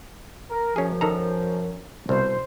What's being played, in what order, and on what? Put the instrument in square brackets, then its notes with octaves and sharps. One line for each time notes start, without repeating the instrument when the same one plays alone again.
[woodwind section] A#4
[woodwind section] F#2 F3 [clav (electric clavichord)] C#4 G#4
[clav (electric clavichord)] D#3 A4 A#5
[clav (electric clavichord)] C2 B2 [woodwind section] C5